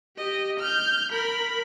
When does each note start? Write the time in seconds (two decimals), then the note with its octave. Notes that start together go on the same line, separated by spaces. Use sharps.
0.17 G4 D#5
0.59 F6 G6
1.12 A#4 B5